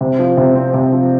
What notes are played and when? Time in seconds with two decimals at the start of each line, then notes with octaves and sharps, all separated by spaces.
0.01 C3
0.19 F3
0.37 C3
0.55 C4
0.74 C3
0.92 F3